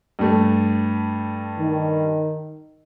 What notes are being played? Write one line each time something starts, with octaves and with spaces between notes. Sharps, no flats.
G2 A3
D#3